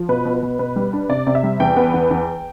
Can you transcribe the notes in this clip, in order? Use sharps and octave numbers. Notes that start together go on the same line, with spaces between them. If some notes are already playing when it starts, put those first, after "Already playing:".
Already playing: F3
B2 B4
B2
B4
B2
B2 B4
G3
D4
C3 D5
C3
E5
G3
E2 G5
B3
E2
E2